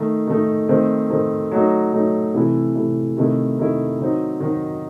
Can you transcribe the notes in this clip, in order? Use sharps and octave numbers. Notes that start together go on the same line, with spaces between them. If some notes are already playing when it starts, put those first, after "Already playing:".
Already playing: D#3 A3 D#4
D#3 A3 D#4
D#3 A3 C4
D#3 A3 C4
F#3 A3 D#4
F#3 A3 D#4
C3 E3 A3 E4
C3 E3 A3 E4
C3 D#3 A3 E4
C3 D#3 A3 E4
D#3 F#3 C4 D#4
D#3 F#3 C4 D#4